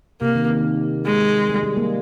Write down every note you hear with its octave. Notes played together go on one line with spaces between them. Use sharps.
C3 A#3
D#3
D#3
G#3
G3
G#3
G3 A#3